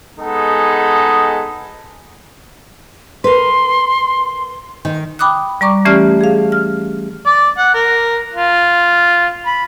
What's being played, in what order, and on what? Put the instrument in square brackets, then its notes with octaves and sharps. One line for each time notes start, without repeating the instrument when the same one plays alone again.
[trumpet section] G#3 B3 D#4 G#4 A4
[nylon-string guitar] A#4 B4 [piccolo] C6
[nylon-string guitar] D#3
[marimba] G5 B5 D6 D#6 F#6
G3 D5 A#5 C#6 D6
E3 A3 C#4 G4 D5 F6
G#4 F5
F6
[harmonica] D5
F#5
A#4
F4
B5